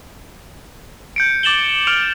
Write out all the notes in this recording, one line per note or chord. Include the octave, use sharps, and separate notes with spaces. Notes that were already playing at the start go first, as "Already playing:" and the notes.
G6 C#7 D7
D6 A6 E7 F#7 G7
D6 F6 D7 F7 F#7